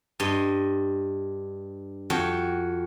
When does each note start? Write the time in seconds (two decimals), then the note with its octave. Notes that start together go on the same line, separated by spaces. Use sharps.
0.20 G2 D#5 C6
2.10 F2 F#4 G5